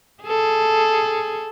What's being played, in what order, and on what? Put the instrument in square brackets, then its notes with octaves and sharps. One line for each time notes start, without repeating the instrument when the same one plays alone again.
[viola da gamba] G#4 A4